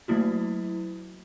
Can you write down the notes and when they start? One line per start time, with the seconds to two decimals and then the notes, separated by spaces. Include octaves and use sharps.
0.08 F#3 A3 A#3 E4 F#4